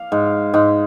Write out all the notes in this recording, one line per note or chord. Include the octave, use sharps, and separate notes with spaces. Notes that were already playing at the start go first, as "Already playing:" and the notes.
Already playing: F5
G#2
G#2